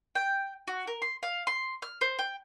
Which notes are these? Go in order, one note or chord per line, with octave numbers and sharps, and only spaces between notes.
G5
F#4
A#4
C6
F5
C6
F6
C5
G5